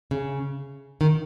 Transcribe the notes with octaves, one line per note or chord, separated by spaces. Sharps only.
C#3
D#3